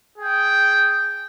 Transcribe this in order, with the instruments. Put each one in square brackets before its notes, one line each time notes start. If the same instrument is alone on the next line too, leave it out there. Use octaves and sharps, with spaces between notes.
[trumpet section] G#4 G5